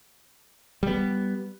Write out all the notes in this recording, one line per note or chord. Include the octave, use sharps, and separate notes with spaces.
G3 B3